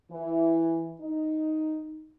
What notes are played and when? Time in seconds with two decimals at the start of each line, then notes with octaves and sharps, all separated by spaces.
0.11 E3
1.01 D#4